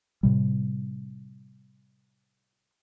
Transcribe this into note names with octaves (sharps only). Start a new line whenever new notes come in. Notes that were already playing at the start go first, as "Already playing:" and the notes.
A2 C3 G3